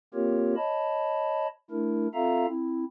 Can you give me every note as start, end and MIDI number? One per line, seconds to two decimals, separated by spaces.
0.14 0.55 58
0.14 0.55 60
0.14 0.55 65
0.14 0.55 67
0.14 0.55 70
0.14 0.55 73
0.56 1.47 73
0.56 1.47 75
0.56 1.47 81
0.56 1.47 83
1.71 2.07 57
1.71 2.07 62
1.71 2.07 64
1.71 2.07 70
2.14 2.46 60
2.14 2.46 65
2.14 2.46 69
2.14 2.46 76
2.14 2.46 77
2.14 2.46 82
2.48 2.85 60
2.48 2.85 64